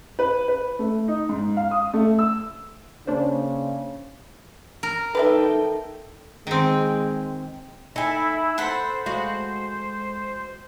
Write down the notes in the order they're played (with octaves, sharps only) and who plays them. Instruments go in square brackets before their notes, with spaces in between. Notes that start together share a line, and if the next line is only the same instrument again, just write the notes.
[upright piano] B4
B4
A3
D#4
G#2
F5
D#6
A3
E6
[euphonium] C#3 [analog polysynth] A#3 D4 C5
[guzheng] A#4
[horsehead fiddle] D#4 G5 [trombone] A4 [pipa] B4 D5 E5
[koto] D#3 C4 [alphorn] G#3
[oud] D#4 [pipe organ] E4 E5 [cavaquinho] A4 G#5
[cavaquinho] A4 F#5 B5 [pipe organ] C5
[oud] G#3 F#4 F5